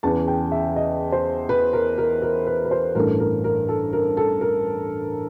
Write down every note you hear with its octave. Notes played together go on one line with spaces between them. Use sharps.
E2 C#3 E3 A5
G5
E5
D#5
C5
B4
A#4
A#4
A#4
B4
B4
C5
A1 G2 E3 A3 A#4
A#4
A#4
A4
A#4
A4
A#4